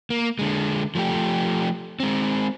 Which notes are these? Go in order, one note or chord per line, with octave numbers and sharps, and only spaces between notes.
A#3
D3 G#3
F3 A3 G4
G#3 C4